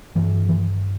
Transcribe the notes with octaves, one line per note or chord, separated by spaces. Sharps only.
G2 E3
E3